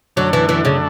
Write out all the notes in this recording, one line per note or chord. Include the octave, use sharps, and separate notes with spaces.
F#2 D3 F#3 A3 D4
E3
E3
C#3